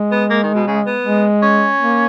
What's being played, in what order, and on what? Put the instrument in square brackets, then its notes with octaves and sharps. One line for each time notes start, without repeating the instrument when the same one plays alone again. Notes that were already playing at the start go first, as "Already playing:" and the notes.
Already playing: [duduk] G#3
[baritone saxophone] B3
A#3
D#3
B2
C#3
B3
[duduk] G#3
[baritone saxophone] C#4
[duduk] A#3